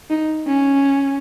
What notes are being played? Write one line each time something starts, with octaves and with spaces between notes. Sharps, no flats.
D#4
C#4